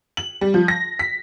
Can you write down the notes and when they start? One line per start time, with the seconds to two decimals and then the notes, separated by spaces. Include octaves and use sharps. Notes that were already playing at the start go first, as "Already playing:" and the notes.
0.17 F#7
0.41 G3
0.54 F3
0.68 A#6
0.99 B6